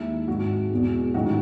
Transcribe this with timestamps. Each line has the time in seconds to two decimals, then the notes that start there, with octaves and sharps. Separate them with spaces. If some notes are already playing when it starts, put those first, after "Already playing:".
Already playing: D#2 D#3 G#3 E4
0.27 G#1 G#2 D#3 F#3 F#4
0.70 E2 B2 G#3
1.14 A1 G#2 D#3 F#3 F#4